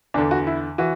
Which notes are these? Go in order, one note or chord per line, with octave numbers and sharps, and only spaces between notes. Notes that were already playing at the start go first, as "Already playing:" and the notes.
E2 D3 D4
F#4
E4
E3 F#4